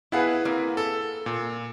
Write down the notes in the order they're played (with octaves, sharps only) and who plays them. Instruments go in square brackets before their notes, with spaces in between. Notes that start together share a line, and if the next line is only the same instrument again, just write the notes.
[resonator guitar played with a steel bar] B3 F5 F#5 [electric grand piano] E4 G#4 B4
[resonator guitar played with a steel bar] A#3 C4
[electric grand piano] A4
A#2